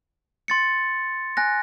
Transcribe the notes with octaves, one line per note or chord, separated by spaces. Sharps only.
C6 A6 C#7
G#5 F#6 A#6